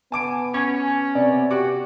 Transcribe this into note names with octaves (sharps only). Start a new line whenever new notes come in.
B3 G#5 A5 D6 D7
C#4 G#6
C3 B3 D5
F#4 G4 D6